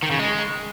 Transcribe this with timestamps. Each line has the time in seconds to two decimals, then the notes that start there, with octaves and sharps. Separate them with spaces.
0.03 D#3
0.11 C#3
0.19 G#3